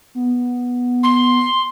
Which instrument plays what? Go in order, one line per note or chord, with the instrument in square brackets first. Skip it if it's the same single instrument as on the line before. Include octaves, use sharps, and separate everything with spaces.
[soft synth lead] B3
[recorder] C6